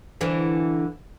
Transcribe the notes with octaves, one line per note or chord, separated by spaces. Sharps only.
D3 E3